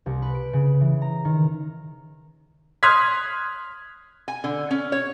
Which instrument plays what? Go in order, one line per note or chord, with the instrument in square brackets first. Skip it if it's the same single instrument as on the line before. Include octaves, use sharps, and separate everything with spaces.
[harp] C2
B4
D7
C#3
E3
A#5
D#3
[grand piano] C6 D#6 F6 F#6 G#6 B6
[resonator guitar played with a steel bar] G#5
D3
C#4
C#5